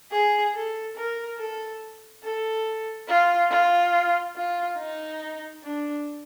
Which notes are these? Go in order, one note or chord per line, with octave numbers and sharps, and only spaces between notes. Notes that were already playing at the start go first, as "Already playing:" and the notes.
G#4
A4
A#4
A4
A4
F4
F4
F4
D#4
D4